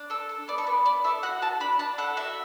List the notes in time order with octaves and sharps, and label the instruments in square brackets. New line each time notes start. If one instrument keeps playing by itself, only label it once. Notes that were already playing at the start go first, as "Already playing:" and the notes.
Already playing: [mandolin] D4
A4 E6
A4
B3 D5
A4
B3 B4
B3 D5
A4 E5
F#4 F#5
F#4 A5
D4 B5
D4 A5
A4 F#5
F#4 E5